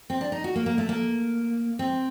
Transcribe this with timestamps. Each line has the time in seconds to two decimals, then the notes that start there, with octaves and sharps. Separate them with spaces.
0.10 C4
0.21 D4
0.32 D#4
0.44 F#4
0.56 A#3
0.66 A#3
0.78 A3
0.89 A#3
1.79 C4